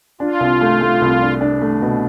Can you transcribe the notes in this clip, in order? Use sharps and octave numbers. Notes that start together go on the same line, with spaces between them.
D4 F4
C2
A3
A3
C2
D4
D4
A3
B2